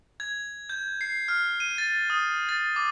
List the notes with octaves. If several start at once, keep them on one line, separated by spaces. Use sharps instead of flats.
G#6
G6
C7
F6
D#7
A6
D#6
A6
D6